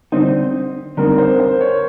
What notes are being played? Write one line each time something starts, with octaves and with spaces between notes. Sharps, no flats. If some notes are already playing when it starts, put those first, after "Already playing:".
D3 G3 C4 D#4 C5
D3 G3 C4 D#4 A#4
C5
C5
C#5